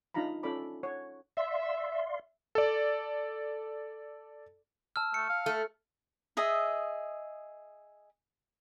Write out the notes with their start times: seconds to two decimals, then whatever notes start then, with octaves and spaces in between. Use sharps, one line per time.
0.14 D4 D#4 F4 F5 A#5 B5
0.43 C#4 F4 A4 D5 B5 D6
0.83 C#5 F#5
1.37 D5 E5 F5 C6
2.55 A4 D5
4.96 A5 E6 F6
5.14 A3 C#7
5.29 F5
5.46 A3
6.37 G#4 D#5 E5